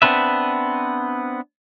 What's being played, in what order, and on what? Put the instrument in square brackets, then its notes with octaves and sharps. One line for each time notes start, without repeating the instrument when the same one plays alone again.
[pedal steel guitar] B3 C4 D4 B4 E5